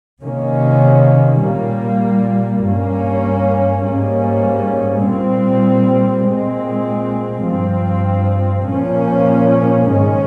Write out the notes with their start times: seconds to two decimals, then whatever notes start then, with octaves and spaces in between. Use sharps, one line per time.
0.23 C3 D#3 A#3 C#4
1.43 A#2 G3 A#3
2.64 G2 G3 A#3 C#4
3.85 G#2 G3 A#3 C#4
5.06 A#2 G3 C4
6.27 A#2 G#3 C4
7.48 G2 F3 C4
8.69 A#2 F3 A#3 C#4
9.90 G#2 D#3 G#3 C#4